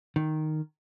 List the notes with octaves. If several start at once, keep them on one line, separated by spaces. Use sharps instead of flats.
D#3